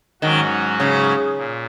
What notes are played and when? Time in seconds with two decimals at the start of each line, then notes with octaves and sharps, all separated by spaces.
0.22 G#2 D#3 F#3 C#4 F#4
0.80 C#3
1.37 A#2